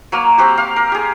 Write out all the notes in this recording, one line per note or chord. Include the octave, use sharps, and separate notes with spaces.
F#3 A#3
C4 F#4 G4
F5
A#4
G4 G#4